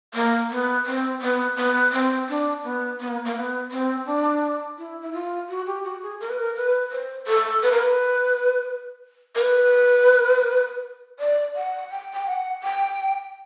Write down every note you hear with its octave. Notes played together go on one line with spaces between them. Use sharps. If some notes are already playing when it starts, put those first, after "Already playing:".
A#3
B3
C4
B3
B3
C4
D4
B3
B3
A#3
A#3
B3
C4
D4
E4
E4
F4
F#4
G4
F#4
G#4
A#4
B4
A#4
B4
C5
A4
B4
A#4
B4
A#4
B4
D5
F#5
G5
G5
F#5
G5